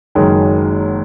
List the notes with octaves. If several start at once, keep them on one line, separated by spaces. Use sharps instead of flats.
F#1 F#2 D#3 G#3